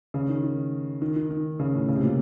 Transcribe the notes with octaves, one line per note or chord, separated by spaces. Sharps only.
C#3
D#3
D#3
D#3
D#3
D#3
C#3
A2
C#3
C3
A#2